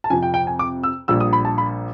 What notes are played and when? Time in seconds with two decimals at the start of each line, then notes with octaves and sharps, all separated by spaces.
0.04 A5
0.10 F2 C3 F3 G#5
0.23 G5
0.34 G5
0.47 G#5
0.59 D6
0.83 E6
1.08 A#1 A#2 G3 E6
1.20 D#6
1.33 B5
1.45 A5
1.58 B5